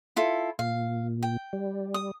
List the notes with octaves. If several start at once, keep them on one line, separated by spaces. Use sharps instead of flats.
E4 F4 A4
A#2 F5
G5
G3
D#6